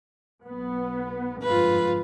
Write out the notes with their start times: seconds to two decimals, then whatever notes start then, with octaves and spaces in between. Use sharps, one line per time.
0.44 B1 B3
1.42 G1 F2 G#2 F4 B4